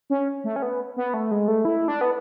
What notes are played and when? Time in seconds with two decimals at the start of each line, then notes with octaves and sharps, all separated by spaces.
0.10 C#4
0.44 A3
0.56 C#4
0.62 B3
0.96 B3
1.14 A3
1.31 G#3
1.48 A3
1.65 E4
1.88 D4
2.01 B3